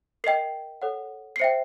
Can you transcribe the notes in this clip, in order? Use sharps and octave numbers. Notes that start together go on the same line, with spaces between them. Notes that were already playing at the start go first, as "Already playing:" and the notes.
A#4 D#5 G5 C7
A4 C#5 F#5
C7
C5 E5 G5 C#7